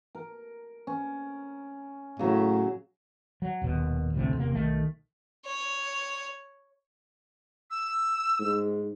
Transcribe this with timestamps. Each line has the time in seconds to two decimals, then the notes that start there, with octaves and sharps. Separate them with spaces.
0.15 A#4
0.87 C#4
2.19 A2 C#3 F#3
3.42 F#3
3.62 D#1 D#2 B2
4.14 A1 D2 C3 A3
4.37 E1 C3 A#3
4.53 B1 D#3 A3
5.46 C#5
7.71 E6
8.40 G#2